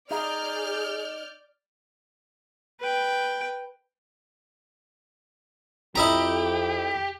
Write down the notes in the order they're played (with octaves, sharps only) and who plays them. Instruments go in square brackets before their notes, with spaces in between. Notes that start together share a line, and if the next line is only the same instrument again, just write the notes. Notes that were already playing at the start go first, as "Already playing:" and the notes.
[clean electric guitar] D#4 [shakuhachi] G#4 [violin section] D5 F6 G6
[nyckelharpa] B4 G5
[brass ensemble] F2 [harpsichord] E4 D#5 A#5 [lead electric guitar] G4